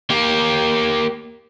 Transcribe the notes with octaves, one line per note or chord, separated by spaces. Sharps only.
A#3 G4